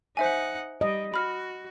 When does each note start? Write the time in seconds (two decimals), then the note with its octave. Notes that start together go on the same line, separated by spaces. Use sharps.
0.17 D#4 C5 E5 F#5 G#5
0.81 G3 D#5
1.14 F#4 B5 F6